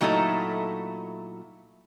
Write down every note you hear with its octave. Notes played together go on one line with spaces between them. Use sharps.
A#2 F#3 A3 D#4 E4 A4